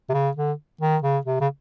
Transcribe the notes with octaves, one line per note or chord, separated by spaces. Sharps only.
C3
C#3
D3
D#3
C#3
C3
C#3